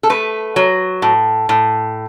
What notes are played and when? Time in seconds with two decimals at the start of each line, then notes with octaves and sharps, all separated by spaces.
0.03 A4
0.10 A3 B4
0.56 F#3
1.02 A2
1.49 A2